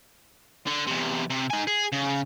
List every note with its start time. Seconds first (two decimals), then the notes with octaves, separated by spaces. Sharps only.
0.67 D3
0.87 E2 C3
1.30 C3
1.50 D#4 G#5
1.67 G#4
1.92 C#3